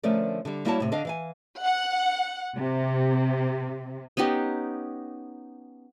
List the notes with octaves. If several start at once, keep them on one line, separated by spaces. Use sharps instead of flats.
D3 F3 A3 C#4 A#4 D5
D3 G3
G3 A#3 E4 F#4 C#5 A5
A2 C3
D3 D4 D#5 F5
E3 F5 G#5
F#5
C3
B3 C#4 D#4 G4